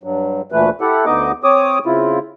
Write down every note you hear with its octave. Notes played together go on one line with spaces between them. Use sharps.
G2 F#3
D2 A#2 E3 A3 B4
E4 G4 A4 F#5
D2 D3 B3 D#4 D#5 D6
C4 C#5 D6 D#6
C#3 C4 E4 F4